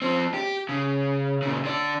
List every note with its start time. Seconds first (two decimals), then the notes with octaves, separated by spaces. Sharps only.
0.02 F3 C4
0.34 G4
0.69 C#3
1.42 A#2 C#3
1.65 D3 D5